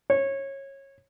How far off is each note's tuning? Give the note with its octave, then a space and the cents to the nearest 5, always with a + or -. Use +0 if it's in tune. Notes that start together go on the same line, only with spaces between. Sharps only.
C#5 -20